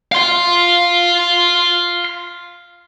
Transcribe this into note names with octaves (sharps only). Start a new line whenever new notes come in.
F5 C6